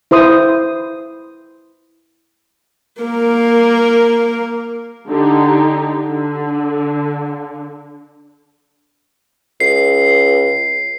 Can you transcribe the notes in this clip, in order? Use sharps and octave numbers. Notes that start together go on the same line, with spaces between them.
E4 C5 C6 D#6
A#3 A#4
D3 D#4 G4
D3
C#2 C7